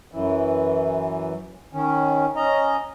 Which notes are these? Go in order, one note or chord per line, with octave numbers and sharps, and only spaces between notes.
F#2 E3
D#3 C#4
C#4 D#5 A#5